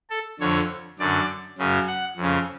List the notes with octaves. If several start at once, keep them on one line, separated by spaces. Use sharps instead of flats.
A4
F2 D3 C#5
F#2 D3 D5
F#2 C#3
F#5
F2 C#3